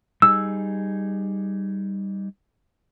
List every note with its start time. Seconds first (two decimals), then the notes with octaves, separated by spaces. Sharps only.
0.22 G3 D#4 G#4 E6